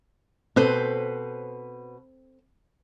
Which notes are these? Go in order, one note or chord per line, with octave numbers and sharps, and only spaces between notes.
B2 C4 A4 B4 C5